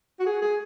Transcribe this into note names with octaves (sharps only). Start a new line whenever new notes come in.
F#4
G#4
G#4